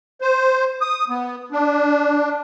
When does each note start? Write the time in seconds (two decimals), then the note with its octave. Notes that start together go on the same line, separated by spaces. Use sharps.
0.21 C5
0.81 D#6
1.09 B3
1.52 D4